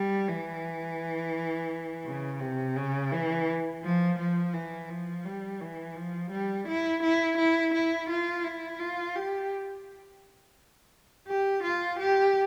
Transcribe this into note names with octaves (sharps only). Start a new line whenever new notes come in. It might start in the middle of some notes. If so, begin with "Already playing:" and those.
Already playing: G3
E3
C#3
C3
C#3
E3
F3
F3
E3
F3
G3
E3
F3
G3
E4
E4
E4
E4
F4
E4
F4
G4
G4
F4
G4